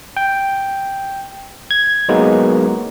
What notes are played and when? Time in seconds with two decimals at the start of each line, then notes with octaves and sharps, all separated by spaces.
0.17 G5
1.71 G#6
2.09 F#3 G#3 A#3 B3 D#4